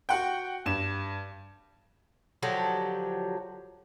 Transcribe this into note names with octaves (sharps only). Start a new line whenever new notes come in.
F#4 F#5 G5
G2 E7
D3 F3 F#3 G4